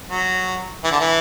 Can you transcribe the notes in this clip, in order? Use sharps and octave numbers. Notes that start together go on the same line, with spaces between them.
F#3
E3
D3
E3